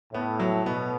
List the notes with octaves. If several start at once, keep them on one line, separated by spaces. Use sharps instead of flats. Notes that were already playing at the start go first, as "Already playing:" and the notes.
A2 B3
F#3
B2 B3